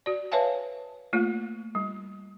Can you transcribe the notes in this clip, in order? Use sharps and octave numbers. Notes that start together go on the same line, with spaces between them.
F#4 D5
B4 C#5 E5 F5 G#5 A5
A3 A#3 F4
G3